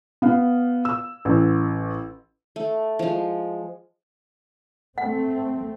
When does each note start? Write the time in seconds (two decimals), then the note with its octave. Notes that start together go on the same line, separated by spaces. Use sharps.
0.22 B3 F5
0.85 E6
1.25 A1
2.56 A3
2.99 F3 G#3
4.98 A3 C4 F#5